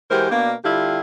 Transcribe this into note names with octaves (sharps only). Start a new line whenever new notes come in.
E3 G#3 F#4 G4 A#4 C5
B2 A#3 D4
D3 G3 D4 E4 F4 G4